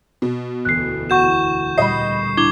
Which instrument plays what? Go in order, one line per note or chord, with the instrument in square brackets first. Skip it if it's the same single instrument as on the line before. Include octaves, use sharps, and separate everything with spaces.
[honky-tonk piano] B2
[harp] E1 D2 [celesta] F#6 C7
[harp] E4 [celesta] F#4 F#5 [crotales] C#6 G6 E7
[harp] A#2 G3 [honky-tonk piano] D#5 B5 [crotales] C7
[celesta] D4 E4 G7 [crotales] D6 G#6